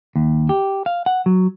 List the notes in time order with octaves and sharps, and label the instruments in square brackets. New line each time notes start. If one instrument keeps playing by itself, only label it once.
[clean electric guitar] D#2
G4
F5
F#5
F#3